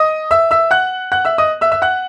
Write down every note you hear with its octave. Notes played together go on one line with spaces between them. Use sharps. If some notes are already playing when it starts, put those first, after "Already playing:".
Already playing: D#5 D#6
E5 E6
E5 E6
F#5 F#6
F#5 F#6
E5 E6
D#5 D#6
E5 E6
E5 E6
F#5 F#6